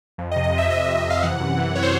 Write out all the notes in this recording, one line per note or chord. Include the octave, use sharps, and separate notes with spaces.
F2
D#5
C3
D#5
C3 E5
F2 D#5
F2 D#5
E5
C3 F5
E3 F#5
F#2
E3
C#5
C5